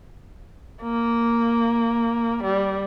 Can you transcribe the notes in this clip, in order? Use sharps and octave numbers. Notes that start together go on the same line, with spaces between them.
A#3
G3